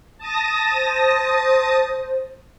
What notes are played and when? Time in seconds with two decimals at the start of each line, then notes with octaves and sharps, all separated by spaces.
0.18 A5 D#6 A#6
0.72 C5